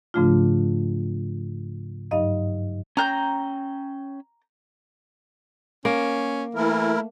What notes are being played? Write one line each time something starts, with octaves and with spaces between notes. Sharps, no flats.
G#2 C#3 F3 A3 D4 F4
G2 F#3 D#4 D#5 F5
C#4 G5 A#5 F#6 G6
A#3 C#4
E3 A3 E4 A#4